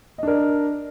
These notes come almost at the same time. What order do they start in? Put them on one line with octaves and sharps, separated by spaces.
D#5 D4 A#4